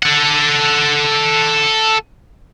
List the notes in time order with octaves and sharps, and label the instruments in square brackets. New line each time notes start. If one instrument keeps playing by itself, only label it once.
[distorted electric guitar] A4 F#5